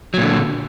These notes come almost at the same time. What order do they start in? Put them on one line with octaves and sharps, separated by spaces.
F#3 A#2 D3